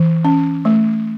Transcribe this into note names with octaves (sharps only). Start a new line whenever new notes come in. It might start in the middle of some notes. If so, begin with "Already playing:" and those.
Already playing: E3
C#4
A3